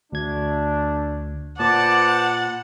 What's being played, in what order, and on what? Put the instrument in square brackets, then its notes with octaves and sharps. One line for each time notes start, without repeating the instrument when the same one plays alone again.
[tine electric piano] D2 G#6 [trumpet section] A3 D4
[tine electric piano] A#2 [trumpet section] B4 C5 D6 [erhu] F#5 [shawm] A5